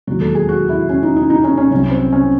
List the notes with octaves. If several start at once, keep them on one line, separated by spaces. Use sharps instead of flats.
E1 D#2 D#3 F#3 F#4
A4
G#4
F#4
E4
C#4
D#4
D#4
D#4
C#4
C#4
C2 C3 F#3 C#4
C4
C#4